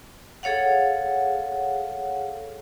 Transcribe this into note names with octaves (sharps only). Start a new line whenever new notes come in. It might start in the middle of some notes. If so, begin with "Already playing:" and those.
G#4 A4 C#5 F5 F#5